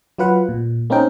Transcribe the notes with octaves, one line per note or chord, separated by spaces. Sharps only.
F#3 F4 B4 F#5
A#2
A#3 C4 C#4 D#4 A#4 G5